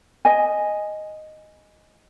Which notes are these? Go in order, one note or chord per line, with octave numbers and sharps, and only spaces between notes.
D#5 G#5